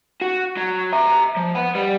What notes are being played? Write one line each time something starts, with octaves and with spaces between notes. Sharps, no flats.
F#4
F#3
E5 A#5
F3
F#5 B5
G3